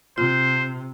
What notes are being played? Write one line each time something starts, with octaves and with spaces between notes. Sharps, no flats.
C3 F4 C5